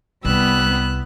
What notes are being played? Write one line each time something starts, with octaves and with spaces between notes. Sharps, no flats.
C2 G3 B3 E6 F#6